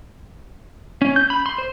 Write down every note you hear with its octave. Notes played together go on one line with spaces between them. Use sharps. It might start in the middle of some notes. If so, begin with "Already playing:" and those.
C#4
G6
B5
C6
C5